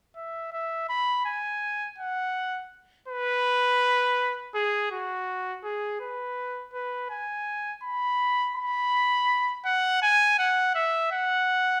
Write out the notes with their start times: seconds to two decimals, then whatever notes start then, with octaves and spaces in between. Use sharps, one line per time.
0.16 E5
0.53 E5
0.89 B5
1.26 G#5
1.99 F#5
3.08 B4
4.55 G#4
4.91 F#4
5.64 G#4
6.00 B4
6.73 B4
7.10 G#5
7.83 B5
8.56 B5
9.65 F#5
10.02 G#5
10.39 F#5
10.75 E5
11.12 F#5